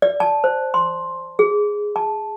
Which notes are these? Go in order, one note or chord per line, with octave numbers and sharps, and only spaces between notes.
D5
A5
C5
C6
G#4
A5